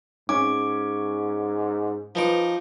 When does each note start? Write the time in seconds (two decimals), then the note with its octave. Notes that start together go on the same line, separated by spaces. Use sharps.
0.29 G#2 C#4 D6
2.15 F3 D#4 B4 D6